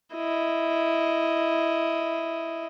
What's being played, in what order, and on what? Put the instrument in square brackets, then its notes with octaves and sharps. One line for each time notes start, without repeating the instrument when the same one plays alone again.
[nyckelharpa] E4 D#5